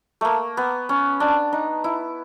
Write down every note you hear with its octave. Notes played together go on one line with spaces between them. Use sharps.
A3 A#3
B3
C#4
D4
D#4
E4